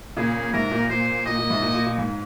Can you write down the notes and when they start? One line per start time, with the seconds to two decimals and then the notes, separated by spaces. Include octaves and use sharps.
0.17 A#2 C#3 G#4
0.53 G#2 C3 A#4
0.71 A#2
0.90 A#2 C5
1.25 A#2 D#5
1.38 A#2
1.50 G#2 C3
1.62 A#2
1.74 A#2
1.86 A#2
1.98 G#2